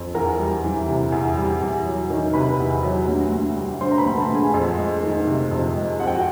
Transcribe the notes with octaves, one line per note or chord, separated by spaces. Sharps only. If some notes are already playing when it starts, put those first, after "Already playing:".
Already playing: F2
E2 A#4 A#5
G3
E3
C3
E2
G3
E2
F#3
D#3
C3 B4 B5
E2
F#3
D2
D2
G3
D3 C5 C6
A#5
B4 B5
D2
A4 A5
D2
G#4 G#5
F2
G#3
D#3
C3
F2
G#3
F2 F#5
G5
F#4 F#5